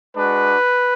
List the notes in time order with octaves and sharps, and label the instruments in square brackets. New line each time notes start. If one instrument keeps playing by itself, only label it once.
[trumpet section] G#3 D4 F#4 B4